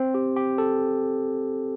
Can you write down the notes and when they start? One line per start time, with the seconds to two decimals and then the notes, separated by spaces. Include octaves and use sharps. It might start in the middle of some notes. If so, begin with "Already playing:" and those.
Already playing: C4
0.14 G4
0.36 G4
0.58 A4